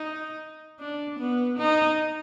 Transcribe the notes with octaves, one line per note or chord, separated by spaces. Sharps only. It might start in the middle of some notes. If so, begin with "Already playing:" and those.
Already playing: D#4
D4
B3
D#4